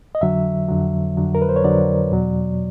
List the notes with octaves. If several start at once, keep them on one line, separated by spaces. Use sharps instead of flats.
D#5
F2 D3 F#3 E5
F2 D3 F#3
F2 D3 F#3
A#4
B4
C5
C#5
F2 D3 F#3 D5
E2 B2 F#3